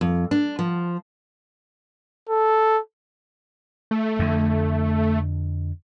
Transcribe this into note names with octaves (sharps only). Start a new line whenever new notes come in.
F2
D4
F3
A4
A3
F2 D3